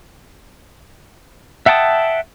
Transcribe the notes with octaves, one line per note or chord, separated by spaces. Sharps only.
E5 F#5 G5 A5 D#6